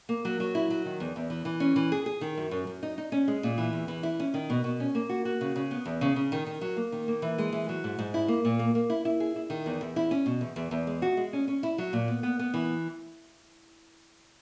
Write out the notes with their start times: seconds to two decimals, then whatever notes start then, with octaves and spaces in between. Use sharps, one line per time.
0.09 A#3
0.25 F#3
0.40 F#3
0.55 E4
0.70 F#3
0.85 D#3
1.00 E2
1.16 E2
1.30 E3
1.45 E3
1.60 C#4
1.76 E3
1.92 G#4
2.06 G#4
2.21 D#3
2.37 F#2
2.51 F#2
2.67 F#2
2.83 D#4
2.98 D#4
3.12 C#4
3.28 G#3
3.43 A#2
3.58 E3
3.73 E2
3.88 E3
4.03 E4
4.20 C#4
4.34 D#3
4.50 B2
4.64 B2
4.80 C#4
4.95 A#3
5.09 F#4
5.25 F#4
5.41 C#3
5.56 C#3
5.71 B3
5.85 E2
6.01 C#3
6.16 C#3
6.32 D#3
6.47 D#3
6.61 F#3
6.77 A#3
6.92 D#3
7.08 A#3
7.22 E3
7.38 G#3
7.52 E3
7.69 F#3
7.84 G#2
7.98 G#2
8.14 E4
8.28 A#3
8.45 A#2
8.59 A#3
8.75 A#3
8.90 E4
9.05 E4
9.20 G#4
9.36 E4
9.50 D#3
9.66 E2
9.81 E2
9.96 E4
10.11 C#4
10.26 B2
10.41 E2
10.56 E2
10.71 E2
10.87 G#3
11.02 F#4
11.17 G#3
11.33 C#4
11.48 C#4
11.63 E4
11.78 F#3
11.93 A#2
12.08 B3
12.23 B3
12.39 B3
12.54 E3